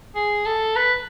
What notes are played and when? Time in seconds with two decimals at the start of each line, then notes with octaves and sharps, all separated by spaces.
0.15 G#4
0.46 A4
0.76 B4